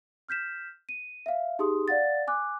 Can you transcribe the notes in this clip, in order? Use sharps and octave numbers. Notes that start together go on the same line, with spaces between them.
F6 G6 B6 E7
D#7
E5 F5
D#4 G4 G#4 C6 D#6
D5 F5 F#5 A6
G#5 D6 F#6